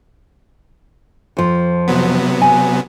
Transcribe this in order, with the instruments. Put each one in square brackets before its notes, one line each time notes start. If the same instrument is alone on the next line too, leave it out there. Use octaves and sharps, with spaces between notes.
[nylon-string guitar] F2 F3
[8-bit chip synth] C3 F#3 B3
[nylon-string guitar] G#5